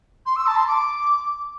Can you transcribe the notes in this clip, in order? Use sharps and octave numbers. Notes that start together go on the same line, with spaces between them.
C6
E6
A5
C6
D6